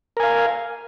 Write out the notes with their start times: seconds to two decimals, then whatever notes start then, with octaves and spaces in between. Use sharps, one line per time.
0.17 A#4
0.20 G#5
0.23 F5